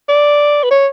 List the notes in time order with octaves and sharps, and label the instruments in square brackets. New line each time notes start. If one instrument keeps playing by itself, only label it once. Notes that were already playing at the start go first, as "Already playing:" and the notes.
[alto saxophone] D5
B4
C#5